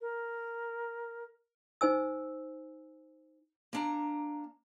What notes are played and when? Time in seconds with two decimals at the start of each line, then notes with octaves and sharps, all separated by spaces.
0.01 A#4
1.81 D#4 C5 G#5 E6
3.73 A#3 D4 A#5